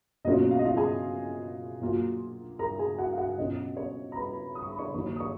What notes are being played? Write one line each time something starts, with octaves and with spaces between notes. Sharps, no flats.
B2 F#3 A#3 C#4 F4 D#5
F5
D#5
F4 F5
G#4 G#5
A#2 F#3 A#3 F4
A#4 A#5
G#4 G#5
F#4 F#5
F5
F#4 F#5
B2 F#3 C#4 F4 D#5
C#5
A#5
B4 B5
D#6
C#6
B5
C#5 C#6
D#2 D#3 F#3 A#3 D#4 C#5 C#6
D#6
C#5 C#6